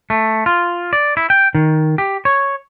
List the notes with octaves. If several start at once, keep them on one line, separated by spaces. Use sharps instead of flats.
A3
F4
D5
E4
G5
D#3
G4
C#5